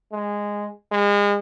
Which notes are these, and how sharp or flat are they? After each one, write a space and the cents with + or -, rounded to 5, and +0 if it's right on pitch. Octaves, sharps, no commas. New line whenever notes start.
G#3 -10
G#3 -35